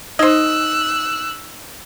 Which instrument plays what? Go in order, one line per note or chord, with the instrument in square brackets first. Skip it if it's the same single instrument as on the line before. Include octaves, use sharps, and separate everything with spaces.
[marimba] D#4 G#6 [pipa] C5 D#5 [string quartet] E6 F#6